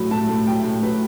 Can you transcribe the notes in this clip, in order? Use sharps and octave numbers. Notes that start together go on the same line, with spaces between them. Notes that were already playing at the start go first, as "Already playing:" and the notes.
Already playing: A2 F#3 B5
A2 A5
A2
F#3 G5
A2
F#3 B4